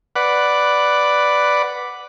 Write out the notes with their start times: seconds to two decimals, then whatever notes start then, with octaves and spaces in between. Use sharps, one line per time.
0.16 B4 D5 F#5